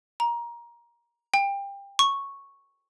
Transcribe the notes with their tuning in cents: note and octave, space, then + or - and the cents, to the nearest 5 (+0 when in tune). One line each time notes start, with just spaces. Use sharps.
A#5 +20
G5 +25
C#6 -5